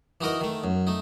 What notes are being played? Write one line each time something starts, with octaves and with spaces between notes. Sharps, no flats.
E3 D#4 F#4 A#4 D#5
D#3 A3
F#2
A3 D#4